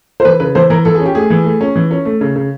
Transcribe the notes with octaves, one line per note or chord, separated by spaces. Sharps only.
C5
E3 B4
C#3 B4
E3 C5
E3 A#4
E3 A4
G#4
C#4
G4
A3 G#4
E3
A3
C#4
E3
C#4
A3
C#3
C#3